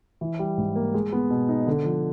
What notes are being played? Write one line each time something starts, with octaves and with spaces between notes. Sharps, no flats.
E3
G3
G#2
A#3
G#3
B3
B2
D#4
D3
F3